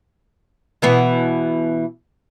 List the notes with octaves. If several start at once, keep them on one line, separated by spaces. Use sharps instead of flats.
B2 E3 B3